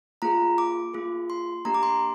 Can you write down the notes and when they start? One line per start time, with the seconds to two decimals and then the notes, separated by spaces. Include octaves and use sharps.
0.22 A#3 F4 G#4 A#5
0.58 D6
0.94 A#3 F4 G#4
1.30 C6
1.65 A#3 D4 G4 A#5
1.74 D6
1.83 C6